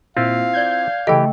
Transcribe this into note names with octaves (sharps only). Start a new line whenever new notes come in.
A#2 C4 E4 F4 F5
D5 G6 G#6
C#3 E3 A3 G4 A4 D#5 G5